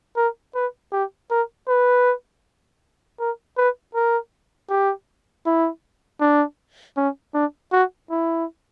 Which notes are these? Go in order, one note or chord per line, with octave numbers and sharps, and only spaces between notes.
A#4
B4
G4
A#4
B4
A#4
B4
A#4
G4
E4
D4
C#4
D4
F#4
E4